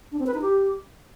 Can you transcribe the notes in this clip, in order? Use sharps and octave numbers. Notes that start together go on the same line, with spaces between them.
D4
C4
B4
D#4
G4